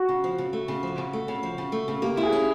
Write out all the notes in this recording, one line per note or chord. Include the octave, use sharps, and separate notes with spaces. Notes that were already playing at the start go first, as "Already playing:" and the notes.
Already playing: F#4
C#3
F3
C#3
A3
C#3
F3
C#3
A3
C#3
F3
C#3
A3
C#3
A#3 G4
E4
G#4
C#4